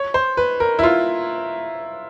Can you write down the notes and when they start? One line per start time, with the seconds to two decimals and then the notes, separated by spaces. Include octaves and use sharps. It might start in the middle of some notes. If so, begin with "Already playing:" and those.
Already playing: C#5
0.14 C5
0.37 B4
0.60 A#4
0.79 E4
0.83 F4